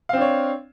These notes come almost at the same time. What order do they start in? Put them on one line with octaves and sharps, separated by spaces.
F5 C4 D4 C#5